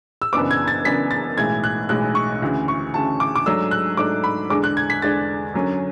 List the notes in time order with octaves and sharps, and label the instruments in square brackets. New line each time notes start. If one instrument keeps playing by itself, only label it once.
[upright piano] E6
F#1 F#2 E3 B3 D4 D6
G#6
A6
F#1 F#2 E3 B3 D4 B6
A6
B1 A2 E3 G#3 G#6
F#6
B1 A2 E3 G#3 F#6
C#6
D2 C#3 E3
C#6
D2 C#3 E3 A5
D6
D6
G#2 F#3 A3 D4 E6
F#6
G#2 F#3 A3 D4 D6
B5
E2 D3 G#3 D4 D6
F#6
G#6
B6
E2 D3 G#3 D4 A6
F#2 D3 F#3 C#4